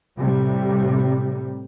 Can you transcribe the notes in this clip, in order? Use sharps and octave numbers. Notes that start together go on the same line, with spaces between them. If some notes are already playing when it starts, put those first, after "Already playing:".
A2 C3 G3